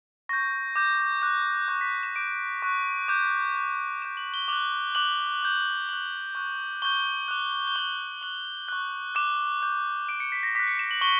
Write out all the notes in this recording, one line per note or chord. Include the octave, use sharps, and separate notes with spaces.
C#6 G6 A#6
D6 G6
D6 F#6
C#6 G6
B6
E7
D6 G6 D7
C#6 F#6
D6 G6
D6 G6
D6 G6 E7
F#7
G7
D6 F#6 F#7
D6 F#6 F#7
D6 G6
C#6 F#6 F#7
C#6 F#6
C#6 G6 G7
D6 F#6
G7
C#6 G6 F#7
C#6 F#6 F#7
C#6 F#6
D6 F#6 E7
D6 G6
D6 F#6 D7
C#7
B6
A#6
D6 F#6 B6
C#7
E7
F#7
C#6 G7